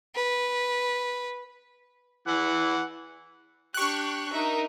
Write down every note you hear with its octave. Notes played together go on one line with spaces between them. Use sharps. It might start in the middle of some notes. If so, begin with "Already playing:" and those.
B4
E3 F#5
D4 G4 C#6 F#6
D#4 A#4 E5